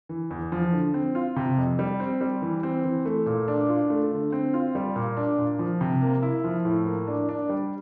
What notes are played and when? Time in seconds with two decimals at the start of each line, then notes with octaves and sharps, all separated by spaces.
0.09 E3
0.31 E2
0.52 F3
0.73 D3
0.94 C4
1.15 F4
1.36 C3
1.57 F2
1.79 G3
2.00 C4
2.21 G3
2.42 E3
2.63 C4
2.84 E3
3.06 A3
3.26 A#2
3.48 D4
3.69 F4
3.90 A3
4.11 D3
4.32 C4
4.54 F4
4.75 G3
4.96 A#2
5.17 D4
5.38 A#2
5.59 F3
5.81 C3
6.02 A#3
6.23 E4
6.44 F3
6.65 A2
6.86 A#3
7.07 D4
7.29 D4
7.49 G3